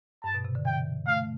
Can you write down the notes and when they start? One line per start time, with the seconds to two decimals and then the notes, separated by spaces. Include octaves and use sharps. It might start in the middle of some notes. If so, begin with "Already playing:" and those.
0.24 G2 A5
0.34 B2
0.45 C3
0.55 D3
0.65 E3 G5
1.06 A3 F5